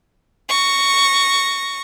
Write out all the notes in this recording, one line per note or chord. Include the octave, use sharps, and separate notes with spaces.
C#6 A#6